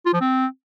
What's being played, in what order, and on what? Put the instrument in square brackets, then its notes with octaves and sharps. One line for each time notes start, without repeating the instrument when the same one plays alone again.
[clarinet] F4
F3
C4